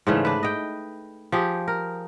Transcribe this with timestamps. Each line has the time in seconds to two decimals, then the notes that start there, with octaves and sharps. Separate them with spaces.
0.07 G#2 C#3 E3 A3
0.25 D4 B4
0.43 D#5 G5
1.32 F3 G4 G#4
1.68 A#4